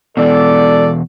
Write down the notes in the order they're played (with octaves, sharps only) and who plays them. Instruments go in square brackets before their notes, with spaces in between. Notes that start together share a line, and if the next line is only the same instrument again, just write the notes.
[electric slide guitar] E2 B2 [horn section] A4 D5